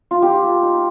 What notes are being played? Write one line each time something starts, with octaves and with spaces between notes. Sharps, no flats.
F4
D#4 G4
A#3
D#4